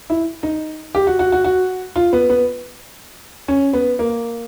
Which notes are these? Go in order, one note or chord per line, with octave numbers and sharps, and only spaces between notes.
E4
D#4
G4
F#4
F#4
F#4
F#4
F4
B3
B3
C#4
B3
A#3